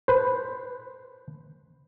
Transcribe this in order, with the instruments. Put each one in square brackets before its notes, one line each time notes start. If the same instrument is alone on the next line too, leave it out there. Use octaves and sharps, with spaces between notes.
[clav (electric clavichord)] B4 C5